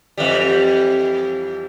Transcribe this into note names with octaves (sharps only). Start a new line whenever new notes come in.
F2 E3 G3